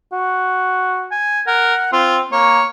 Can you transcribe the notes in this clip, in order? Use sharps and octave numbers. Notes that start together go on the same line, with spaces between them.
F#4
G#5
A#4 F#5
C4 F4
A#3 C#5